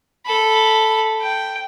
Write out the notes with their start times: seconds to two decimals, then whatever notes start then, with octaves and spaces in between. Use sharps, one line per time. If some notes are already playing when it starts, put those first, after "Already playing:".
0.26 A4 B5
1.21 G5